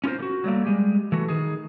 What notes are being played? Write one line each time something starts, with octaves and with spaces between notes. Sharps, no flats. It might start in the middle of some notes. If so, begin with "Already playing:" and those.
C#4 F4 G4 A#4 C5
D3 F#4
F#3 G3 A3 A#3
G3 G#3 G4
E3 A3 F#4
D#3 G#4